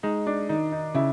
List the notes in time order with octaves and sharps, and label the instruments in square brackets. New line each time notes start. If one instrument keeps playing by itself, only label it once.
[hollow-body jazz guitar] G#3 [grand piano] D#4
[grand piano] D4
[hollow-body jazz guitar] D#3 [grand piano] D#4
[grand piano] D#4
[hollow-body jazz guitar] C#3 [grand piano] E4